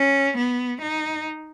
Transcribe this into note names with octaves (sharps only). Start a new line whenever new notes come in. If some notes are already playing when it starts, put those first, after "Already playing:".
Already playing: C#4
B3
D#4